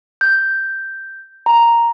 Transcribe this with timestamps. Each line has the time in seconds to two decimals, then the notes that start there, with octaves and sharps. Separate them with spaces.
0.21 G6
1.46 A#5